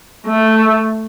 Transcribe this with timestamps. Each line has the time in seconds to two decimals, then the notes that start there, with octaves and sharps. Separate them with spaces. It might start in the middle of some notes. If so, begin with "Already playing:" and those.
0.27 A3